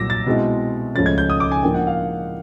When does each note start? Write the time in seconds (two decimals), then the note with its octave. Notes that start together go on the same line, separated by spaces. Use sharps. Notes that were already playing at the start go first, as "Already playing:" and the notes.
Already playing: C2 A#2 F#3 D6 E6 A#6
0.10 A6
0.26 B2 G#3 C4 E4
0.95 C#2 C#3 F3 A3 C#4 A6
1.06 G#6
1.18 G6
1.30 D#6
1.40 D6
1.52 G#5
1.63 A2 F3 A#3 D4 G5
1.74 F#5
1.87 F5